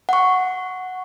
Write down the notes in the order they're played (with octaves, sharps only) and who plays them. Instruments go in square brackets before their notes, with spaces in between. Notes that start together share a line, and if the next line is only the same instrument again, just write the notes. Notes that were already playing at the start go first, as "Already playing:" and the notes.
[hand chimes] F#5 C#6